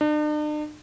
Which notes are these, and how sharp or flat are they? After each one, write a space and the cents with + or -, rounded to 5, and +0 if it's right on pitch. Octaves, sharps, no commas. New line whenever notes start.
D4 +45